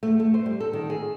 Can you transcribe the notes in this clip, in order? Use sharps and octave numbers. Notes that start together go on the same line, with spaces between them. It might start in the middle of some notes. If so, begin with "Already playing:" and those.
A3
A3
C5
G3
A4
D#3
G#4